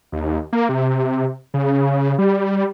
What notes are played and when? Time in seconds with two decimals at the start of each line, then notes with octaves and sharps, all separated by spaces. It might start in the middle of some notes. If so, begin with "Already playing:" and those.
0.12 D#2
0.53 A#3
0.69 C3
1.54 C#3
2.19 G3